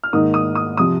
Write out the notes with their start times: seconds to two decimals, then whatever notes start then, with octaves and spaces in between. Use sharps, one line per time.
0.04 F6
0.13 G#2 D#3 A#3 D#4 D#6
0.34 D#6
0.55 D#6
0.77 C3 F3 D#6